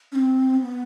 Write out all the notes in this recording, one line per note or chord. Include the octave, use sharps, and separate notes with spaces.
C#4
C4
B3